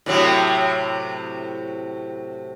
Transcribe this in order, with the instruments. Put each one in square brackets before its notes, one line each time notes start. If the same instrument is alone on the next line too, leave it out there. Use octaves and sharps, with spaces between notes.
[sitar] A2 C3 F#3